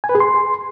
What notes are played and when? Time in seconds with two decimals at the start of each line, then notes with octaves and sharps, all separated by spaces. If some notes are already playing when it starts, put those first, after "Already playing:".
0.04 G#5
0.09 B4
0.15 G#4
0.20 C6